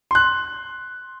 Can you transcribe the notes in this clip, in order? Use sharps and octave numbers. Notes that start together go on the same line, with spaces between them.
C6 F#6